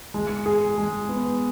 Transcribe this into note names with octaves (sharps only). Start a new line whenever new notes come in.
G#3
G#4
G#3
B3